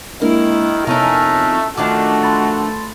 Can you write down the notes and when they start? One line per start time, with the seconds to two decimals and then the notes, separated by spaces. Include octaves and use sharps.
0.22 D#3 G#3 A#3 D4 E4 A#4
0.87 F2 C3 A3 B3 C#4 D#4 A#4 A#5
1.77 D#3 F3 A3 D4 F#4 D6
2.23 B5 C6 A6